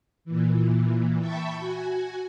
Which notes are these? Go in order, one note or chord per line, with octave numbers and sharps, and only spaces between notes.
A#2 E3
E5 G5 A5 B5 C#6
F#4 G#5